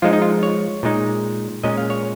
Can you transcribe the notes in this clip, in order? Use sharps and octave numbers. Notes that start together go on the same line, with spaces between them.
F3 G#3 D#4 F4
D#4
F4
C#5
A#2 G#3 D#4
A#2 G#3 C#4 D#5
F5
C#5